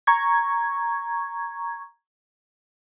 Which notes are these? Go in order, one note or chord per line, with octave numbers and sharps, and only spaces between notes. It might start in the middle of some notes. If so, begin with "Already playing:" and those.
A#5 C#6 G#6